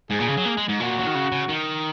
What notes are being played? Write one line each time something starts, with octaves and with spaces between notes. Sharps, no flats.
G#2 G#4
A#2
C#3
F#3
A#3
G#3
G#2
A#2 F#4
F#3
D#3
C#3
C#3
D#3